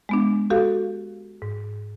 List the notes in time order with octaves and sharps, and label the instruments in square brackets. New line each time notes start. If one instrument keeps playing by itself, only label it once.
[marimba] G#3 B3 D4
F#4 G4 A4 F5
G#2